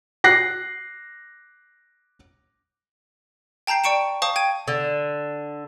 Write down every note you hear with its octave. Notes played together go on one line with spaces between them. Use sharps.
F#6 A#6 C7
G5 A5 A#5 G6 C7
D5 G5 C#6 C#7 D7 E7
C5 F5 A5 C#6 D#6
G5 G#6 D#7
D3